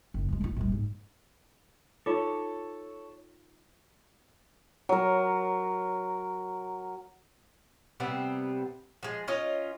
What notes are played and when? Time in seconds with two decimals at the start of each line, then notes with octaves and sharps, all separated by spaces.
0.14 F#1
0.28 G3 G#3
0.41 E1 F4
0.56 A#1 G3
0.72 G#2
2.06 D#4 F4 A4 C#5 D6
4.89 F#3 A#4
8.00 C3 G3 B3 C4
9.03 F3 G#3
9.28 C#4 F4 D#5